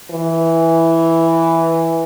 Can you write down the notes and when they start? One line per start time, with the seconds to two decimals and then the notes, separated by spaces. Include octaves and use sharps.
0.11 E3